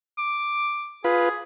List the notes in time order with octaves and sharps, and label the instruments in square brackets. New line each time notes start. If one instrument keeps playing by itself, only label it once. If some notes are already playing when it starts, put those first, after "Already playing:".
[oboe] D6
[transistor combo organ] F4 B4 [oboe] G#4